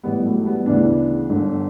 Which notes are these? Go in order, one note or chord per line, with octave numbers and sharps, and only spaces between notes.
A1 A2 E3 G3 B3
F#3 A3
G3 B3
D2 C#3 E3 B3 D4
G1 G2 D3